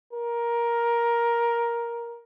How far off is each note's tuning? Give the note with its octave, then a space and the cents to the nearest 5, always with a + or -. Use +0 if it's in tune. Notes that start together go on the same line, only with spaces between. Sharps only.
A#4 +10